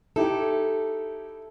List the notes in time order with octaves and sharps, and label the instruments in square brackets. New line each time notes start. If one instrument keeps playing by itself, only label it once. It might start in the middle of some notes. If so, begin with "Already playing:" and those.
[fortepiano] D#4 E4 G4 [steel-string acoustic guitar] A4